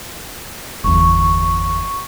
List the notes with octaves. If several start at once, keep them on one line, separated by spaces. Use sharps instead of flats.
G1 E2 C#6